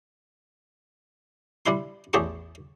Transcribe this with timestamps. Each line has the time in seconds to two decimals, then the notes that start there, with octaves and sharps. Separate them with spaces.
1.66 G3 D4 E4 C6
2.13 A1 E2 G4 G#4 A5 C#6